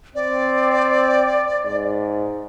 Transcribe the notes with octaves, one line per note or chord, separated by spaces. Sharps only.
C4 D5
G#2